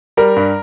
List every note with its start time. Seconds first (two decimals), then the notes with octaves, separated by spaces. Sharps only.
0.17 G3 A#4
0.36 G2